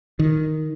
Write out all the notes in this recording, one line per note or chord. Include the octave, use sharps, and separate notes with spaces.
D#3